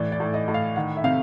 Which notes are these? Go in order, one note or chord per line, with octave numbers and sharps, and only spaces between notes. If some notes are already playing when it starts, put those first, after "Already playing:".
Already playing: A2 E3 D5
D5
A2
D#5
A2
F5
D#3 F#5
E5
C3 F5